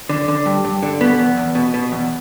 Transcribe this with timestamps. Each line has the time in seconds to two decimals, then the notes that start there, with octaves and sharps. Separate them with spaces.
0.09 D3
0.28 D3
0.46 G2
0.65 G2
0.83 D3
1.01 B2 B3
1.19 E2
1.37 E2
1.55 B2
1.74 B2
1.92 E2